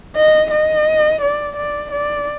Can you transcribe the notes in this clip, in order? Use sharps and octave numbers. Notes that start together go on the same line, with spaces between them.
D#5
D#5
D5
D5
D5